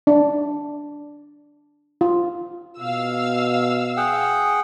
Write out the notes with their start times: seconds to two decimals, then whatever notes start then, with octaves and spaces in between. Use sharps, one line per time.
0.07 D4
2.01 F4
2.80 B2 F5 E6
3.97 G#4 F#5 G5